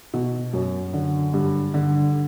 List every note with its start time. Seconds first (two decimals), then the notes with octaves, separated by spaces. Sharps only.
0.14 B2
0.53 F#2
0.94 D3
1.34 G2
1.74 D3